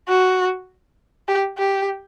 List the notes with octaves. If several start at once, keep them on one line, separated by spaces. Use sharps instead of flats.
F#4
G4
G4